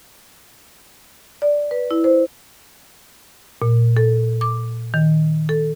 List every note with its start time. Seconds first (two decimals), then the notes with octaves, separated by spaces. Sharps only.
1.42 D5
1.71 B4
1.91 E4
2.04 C5
3.62 A#2
3.97 A4
4.41 D6
4.94 D#3
5.49 A4